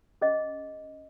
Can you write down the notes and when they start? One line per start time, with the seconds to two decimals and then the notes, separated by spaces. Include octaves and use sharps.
0.21 C#4 G#4 D#5